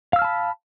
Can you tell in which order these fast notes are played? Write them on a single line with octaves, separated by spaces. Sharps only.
F5 E6 F6 A5 B5